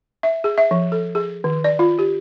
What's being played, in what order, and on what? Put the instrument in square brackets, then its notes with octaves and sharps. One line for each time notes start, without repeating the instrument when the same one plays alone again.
[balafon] E5
G#4
E5
F3
A4
G#4
D#3
D5
F4
G4